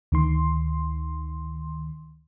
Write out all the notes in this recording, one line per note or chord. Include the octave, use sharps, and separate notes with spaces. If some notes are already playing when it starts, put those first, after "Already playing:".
D2 D#3 C6